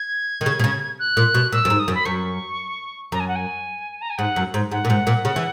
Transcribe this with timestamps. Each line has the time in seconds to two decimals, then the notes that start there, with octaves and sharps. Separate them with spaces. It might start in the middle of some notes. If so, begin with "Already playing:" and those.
Already playing: G#6
0.41 D#3
0.46 C#3
0.59 B2
0.64 C#3
0.99 F#6
1.17 A#2
1.34 B2
1.52 A#2 E6
1.65 F#2
1.70 G#2
1.79 D#6
1.88 F#2
1.94 B5
2.05 F#2 C#6
3.12 F#2 A#5
3.20 G#5
3.28 F#5
3.36 G#5
4.02 A#5
4.10 G#5
4.18 G#2 F#5
4.36 F#2
4.54 G#2
4.72 G#2 F#5
4.85 A#2
4.90 G#2
5.07 A#2
5.25 C#3
5.36 E3